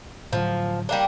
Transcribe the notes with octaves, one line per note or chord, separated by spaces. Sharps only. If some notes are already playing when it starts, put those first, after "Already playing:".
A2 D3 F3 F#3
G3 A#3 D4